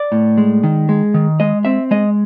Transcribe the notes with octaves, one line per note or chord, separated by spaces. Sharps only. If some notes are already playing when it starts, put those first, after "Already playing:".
Already playing: D5
A2
G#3
D#3
G#3
D#3
G#3 D#5
C4 E5
G#3 D#5